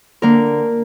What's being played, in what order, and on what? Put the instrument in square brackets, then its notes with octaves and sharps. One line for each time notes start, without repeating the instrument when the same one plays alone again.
[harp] D3 A#3 A#4